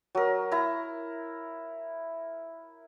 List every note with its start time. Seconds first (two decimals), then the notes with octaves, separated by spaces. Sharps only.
0.15 F#3 A#4
0.51 E4 A#5